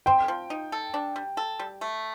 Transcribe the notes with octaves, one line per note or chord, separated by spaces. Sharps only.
C4 G5
F3
D#4
A4
D4
G3
A4
G3
A3